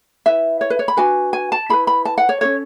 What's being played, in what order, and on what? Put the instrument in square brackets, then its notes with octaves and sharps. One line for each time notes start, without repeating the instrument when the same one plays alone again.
[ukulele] E4 B4 E5
C#5
B4
C#5
B5
D4 F#4 B4 G#5
G#5
A5
E4 G#4 B4 B5
B5
A5
F#5
C#5
C#4 F#4 A4 C#5